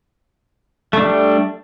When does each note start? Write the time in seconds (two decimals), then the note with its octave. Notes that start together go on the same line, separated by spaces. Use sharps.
0.93 A3
0.97 D4
1.01 G3